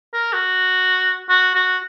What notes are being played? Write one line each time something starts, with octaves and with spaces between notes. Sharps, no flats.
A#4
F#4
F#4
F#4